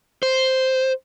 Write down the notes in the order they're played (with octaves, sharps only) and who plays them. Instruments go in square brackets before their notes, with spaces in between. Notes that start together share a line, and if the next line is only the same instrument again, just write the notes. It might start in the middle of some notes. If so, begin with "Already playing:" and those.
[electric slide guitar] C5